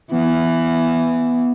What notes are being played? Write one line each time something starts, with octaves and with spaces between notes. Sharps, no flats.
E3 B3